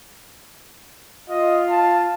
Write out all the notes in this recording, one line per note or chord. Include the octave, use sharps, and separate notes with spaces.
F4 D#5
A5